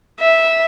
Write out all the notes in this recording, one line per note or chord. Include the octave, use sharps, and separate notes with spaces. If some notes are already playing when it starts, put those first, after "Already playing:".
E5